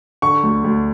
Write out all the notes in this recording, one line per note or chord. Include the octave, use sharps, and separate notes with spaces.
D3 C#6
D2
D2